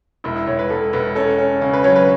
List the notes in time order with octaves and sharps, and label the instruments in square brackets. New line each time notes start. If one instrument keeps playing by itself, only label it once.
[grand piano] E1 [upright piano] E4
[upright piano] E4
[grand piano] E1 [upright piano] C#5
[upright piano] B4
[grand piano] E1 [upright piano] A4
[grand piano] E1 [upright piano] B4
[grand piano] C#4 [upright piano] A4
[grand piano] C#4
C#3
[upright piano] B4
[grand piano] F#3 [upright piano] C#5
[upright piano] B4